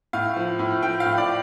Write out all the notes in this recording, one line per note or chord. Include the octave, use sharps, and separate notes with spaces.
A2 F5
F3
A2
F3 G5
F5
A2
D5